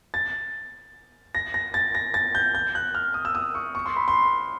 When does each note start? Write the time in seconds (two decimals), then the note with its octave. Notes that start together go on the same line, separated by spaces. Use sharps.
0.14 A6
1.35 A#6
1.54 A#6
1.74 A6
1.95 A#6
2.14 A6
2.35 G6
2.55 G6
2.75 F#6
2.95 F6
3.14 D#6
3.25 E6
3.35 D#6
3.55 C#6
3.75 C#6
3.86 C6
3.96 B5
4.08 C6